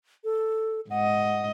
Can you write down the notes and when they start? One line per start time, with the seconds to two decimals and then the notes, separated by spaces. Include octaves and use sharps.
0.24 A4
0.90 G#2 D#5 F#5